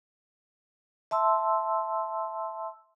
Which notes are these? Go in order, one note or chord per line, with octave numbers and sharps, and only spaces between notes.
E5 A5 C6 E6